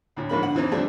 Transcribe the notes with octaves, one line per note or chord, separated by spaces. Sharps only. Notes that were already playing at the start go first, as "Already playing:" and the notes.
D2 A2
G#2 F3 A#3 B5
G2 D3 F#5
E2 E3 C4 D#4
D2 D3 F3 G3 A3 C4